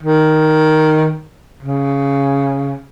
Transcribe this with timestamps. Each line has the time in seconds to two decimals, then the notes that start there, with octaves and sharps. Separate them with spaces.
0.03 D#3
1.62 C#3